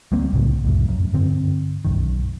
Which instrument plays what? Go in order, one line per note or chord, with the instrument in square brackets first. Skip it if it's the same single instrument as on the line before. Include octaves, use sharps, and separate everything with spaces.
[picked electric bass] D2 G3 A#3 C4
C2 A2 C#3
C2 F2 A2
F#2
G2 D3 C4
B1 F#2 D#3